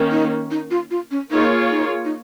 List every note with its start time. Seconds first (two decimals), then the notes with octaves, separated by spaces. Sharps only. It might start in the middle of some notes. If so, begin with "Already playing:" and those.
Already playing: D#3 A#3 C#4
0.11 D#4
0.51 D#4
0.71 F4
0.91 F4
1.11 C#4
1.31 A#3 D#4 F4 G#4 C#5
1.71 D#4
2.05 D#4